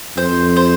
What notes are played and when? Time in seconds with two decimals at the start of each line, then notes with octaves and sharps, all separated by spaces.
0.17 F2 C5
0.57 C5